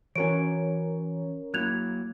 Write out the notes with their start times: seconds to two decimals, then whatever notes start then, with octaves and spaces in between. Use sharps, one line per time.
0.16 E3 C#4 F#4 A#4 C#5 G#5 D7
1.54 F#3 A#3 E4 F#6 G#6 F7